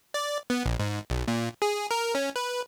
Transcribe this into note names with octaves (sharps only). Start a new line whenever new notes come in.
D5
B3
A#1
G#2
B1
A#2
G#4
A#4
C#4
B4